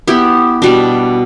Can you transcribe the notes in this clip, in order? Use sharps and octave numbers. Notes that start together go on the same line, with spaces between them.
B3 E4 G4
B2 G3 D4